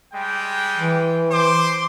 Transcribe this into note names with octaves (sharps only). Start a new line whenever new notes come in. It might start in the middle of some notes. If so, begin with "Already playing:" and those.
G3 G#3 G5
E3
C5 C6 D6